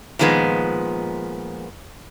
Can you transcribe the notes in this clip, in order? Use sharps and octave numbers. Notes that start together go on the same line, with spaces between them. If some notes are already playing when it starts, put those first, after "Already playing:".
A#2 D#3 F3 G#3 B3